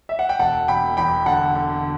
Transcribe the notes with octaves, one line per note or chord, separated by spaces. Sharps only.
E5
F#5
G5
E1 F#5 A5
E1 G5 B5
E2 G5 B5
D3 F#5 A5
D3